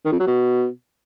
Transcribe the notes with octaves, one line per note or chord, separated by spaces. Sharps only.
D#3
F2
F#3
B2